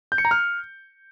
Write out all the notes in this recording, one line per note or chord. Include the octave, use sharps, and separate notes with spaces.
G6
C#7
A#5
F6